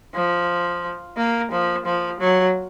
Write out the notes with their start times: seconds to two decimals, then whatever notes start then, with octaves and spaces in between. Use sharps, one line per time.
0.14 F3
1.17 A#3
1.52 F3
1.86 F3
2.20 F#3